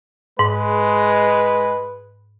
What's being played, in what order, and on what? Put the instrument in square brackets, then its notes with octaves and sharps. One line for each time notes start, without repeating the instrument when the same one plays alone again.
[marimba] G#2 [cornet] G#3 [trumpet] B4